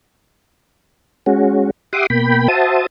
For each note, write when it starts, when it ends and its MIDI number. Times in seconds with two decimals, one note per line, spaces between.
1.26 1.70 56
1.26 1.70 61
1.26 1.70 66
1.93 2.06 67
1.93 2.06 76
1.93 2.06 78
1.93 2.06 84
1.93 2.06 86
1.93 2.06 87
2.10 2.48 47
2.10 2.48 58
2.10 2.48 79
2.10 2.48 83
2.48 2.86 66
2.48 2.86 72
2.48 2.86 76
2.48 2.86 81
2.48 2.86 87